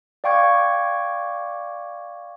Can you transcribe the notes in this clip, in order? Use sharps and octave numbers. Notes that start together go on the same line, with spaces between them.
D5 F5 G5 C#6 D6 G#6